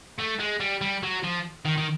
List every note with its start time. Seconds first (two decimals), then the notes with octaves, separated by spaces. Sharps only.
0.18 A3
0.39 G#3
0.60 G3
0.81 G3
1.03 F#3
1.23 F3
1.65 D#3
1.77 D#3